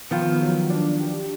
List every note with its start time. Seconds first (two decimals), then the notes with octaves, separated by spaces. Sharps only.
0.11 D#3 F3 B3
0.41 F#3
0.70 D4
1.00 G4